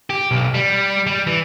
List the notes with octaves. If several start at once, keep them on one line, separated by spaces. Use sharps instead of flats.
G4
B1
G3
G3
E3